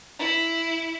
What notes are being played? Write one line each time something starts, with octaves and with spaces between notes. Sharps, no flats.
E4